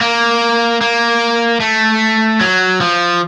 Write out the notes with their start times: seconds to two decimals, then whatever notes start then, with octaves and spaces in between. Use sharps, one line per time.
0.01 A#3
0.81 A#3
1.60 A3
2.41 F#3
2.81 F3